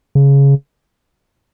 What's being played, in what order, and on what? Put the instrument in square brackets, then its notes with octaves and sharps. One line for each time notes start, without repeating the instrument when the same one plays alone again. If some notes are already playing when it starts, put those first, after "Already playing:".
[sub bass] C#3